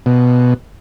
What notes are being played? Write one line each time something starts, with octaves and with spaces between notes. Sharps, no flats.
B2